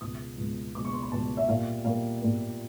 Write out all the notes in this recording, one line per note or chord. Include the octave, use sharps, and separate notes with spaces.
C#2 B2 G#3 D#6
C#2 B2 G#3
C#2 B2 G#3 D6
C#6
C6
B5
C#2 B2 G#3 A5
E5
A#2 G3 A#3 F5
A#2 G3 A#3 F5
A#2 G3 A#3